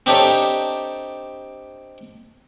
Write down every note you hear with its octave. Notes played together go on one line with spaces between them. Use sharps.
C4 D4 D#4 G4 A4 C#5